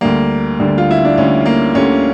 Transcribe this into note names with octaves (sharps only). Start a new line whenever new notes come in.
D2 D3 G3 A#3
D2 D3 G3
F4
E4
D4
D2 D3 G3 C#4
A#3
D2 D3 G3 C#4